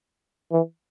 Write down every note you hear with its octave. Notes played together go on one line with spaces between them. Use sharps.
E3